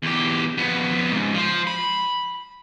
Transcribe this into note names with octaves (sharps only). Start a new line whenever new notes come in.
E2 G4
F2 B3
C#2 G#2
F3 C5
B5